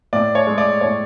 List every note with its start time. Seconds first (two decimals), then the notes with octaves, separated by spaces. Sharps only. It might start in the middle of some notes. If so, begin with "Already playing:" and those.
0.13 A2 D5
0.35 C#5
0.47 G#3
0.58 D5
0.81 A2 C#5